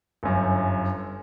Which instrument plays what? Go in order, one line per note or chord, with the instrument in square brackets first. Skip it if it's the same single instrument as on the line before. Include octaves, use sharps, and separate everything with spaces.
[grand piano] G1 F#2